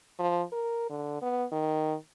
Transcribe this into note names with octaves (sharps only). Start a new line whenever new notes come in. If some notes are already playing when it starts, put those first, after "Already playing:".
F3
A#4
D3
B3
D#3